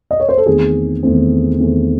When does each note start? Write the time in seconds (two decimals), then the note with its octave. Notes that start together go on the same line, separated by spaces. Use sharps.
0.11 D#5
0.20 C#5
0.29 C5
0.38 A4
0.46 E2 D#3 A3 C4 G#4
1.03 E2 D#3 A3 C4
1.60 E2 D#3 A3 C4